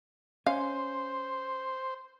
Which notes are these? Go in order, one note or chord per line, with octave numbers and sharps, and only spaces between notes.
C#4 C5 F5